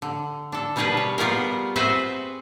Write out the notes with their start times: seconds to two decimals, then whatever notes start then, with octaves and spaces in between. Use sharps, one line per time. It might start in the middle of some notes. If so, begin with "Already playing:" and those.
0.02 D3
0.52 D4 A4
0.76 B2 G3 D4 G#4 A#4 B4
0.97 C#5
1.18 G3 B3 F4 F#4 G#4 A#4
1.76 C4 F#4 G#4 B4 C5 E5